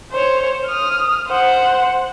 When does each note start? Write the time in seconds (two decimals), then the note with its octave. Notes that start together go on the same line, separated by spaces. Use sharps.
0.12 C5 C#5
0.66 D#6 F6
1.28 C5 F#5